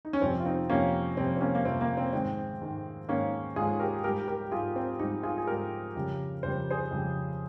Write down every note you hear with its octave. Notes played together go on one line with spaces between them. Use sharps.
D#4
C#4
F2 C3 G3 C4
F4
C4 D#4
F2 C3 G3 A#3 C#4
F2 C3 G3 C4
C4
A#3 C#4
A#3
F2 C3 G3 C4
A#3
C4
G#2 D#3 G#3 C4
G#2 D#3 G#3
G#2 D#3 G#3 A#3 C#4
G#2 D#3 G#3 F4 G#4
G4 A#4
G#2 G3 G4 A#4
G4 A#4
G#2 G3 F4 G#4
C4
G#2 G3 D#4 G4
F4 G#4
G#4
G#2 G3 G4 A#4
F2 C#3 G3
F2 C#3 G3 C5
G#4 C5
F2 C#3 G3